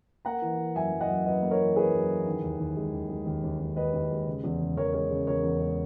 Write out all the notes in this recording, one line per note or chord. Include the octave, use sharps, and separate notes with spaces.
A#3 F#5 A#5
E3
E3
F#2 E5 G#5
F#2
D#5 F#5
F#2
F#2 B4 D#5
A#3
A#4 C#5
E3
E3 G#4 B4
F#2
E3
D#3
D#2
D#2
G#3
D#2
G#3
D#2
D#2
D#2
D#2 B4 D#5
D#2
G#3
C#3
E2
C#3
E2 A#4 C#5
G#3 A#4 C#5
C#3
E2 A#4 C#5
E2
G#3